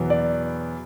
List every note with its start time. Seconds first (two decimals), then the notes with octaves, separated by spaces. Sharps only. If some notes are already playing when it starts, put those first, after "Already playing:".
Already playing: E2 B2 F#3 B3
0.10 D5